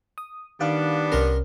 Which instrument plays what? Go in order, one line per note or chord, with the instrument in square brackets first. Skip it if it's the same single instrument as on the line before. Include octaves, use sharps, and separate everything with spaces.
[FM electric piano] D#6
[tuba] D#3 [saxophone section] G3 B3 D4 [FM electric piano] F5
[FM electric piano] C2 C#4 [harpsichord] A#4 A#5 C6